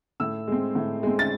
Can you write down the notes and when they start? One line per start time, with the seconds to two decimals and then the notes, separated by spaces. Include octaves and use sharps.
0.20 A2 E6
0.47 G#3 C4
0.75 A2
1.03 G#3 C4
1.19 A6